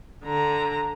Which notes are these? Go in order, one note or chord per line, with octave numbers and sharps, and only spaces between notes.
D3 A#5